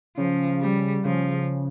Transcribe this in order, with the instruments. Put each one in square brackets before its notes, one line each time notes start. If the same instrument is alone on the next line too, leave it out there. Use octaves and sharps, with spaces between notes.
[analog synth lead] C#3 [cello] F3
[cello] G3
[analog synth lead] C#3 [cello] F3